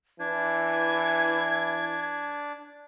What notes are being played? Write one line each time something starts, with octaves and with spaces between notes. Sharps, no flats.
E3 D4 G#6